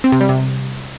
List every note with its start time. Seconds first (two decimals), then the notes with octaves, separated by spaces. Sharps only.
0.04 C4
0.12 C3
0.21 G3
0.29 C3